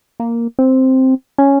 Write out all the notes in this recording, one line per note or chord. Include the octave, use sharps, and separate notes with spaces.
A#3
C4
C#4